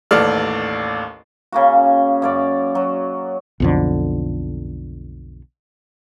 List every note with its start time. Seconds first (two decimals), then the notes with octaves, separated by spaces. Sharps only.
0.11 A1 D#2 A4 D5 F6
1.52 C#3 A#3 F#4
2.22 F#2 C#5 D5
2.75 F#3
3.60 B1 F2 D3